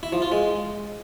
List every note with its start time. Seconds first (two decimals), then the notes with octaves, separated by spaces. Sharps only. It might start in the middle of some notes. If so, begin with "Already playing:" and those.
0.03 E4
0.13 F3
0.22 F4
0.32 G#3